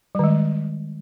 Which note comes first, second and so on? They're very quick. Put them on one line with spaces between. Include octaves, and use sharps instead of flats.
G3 D#3 G#3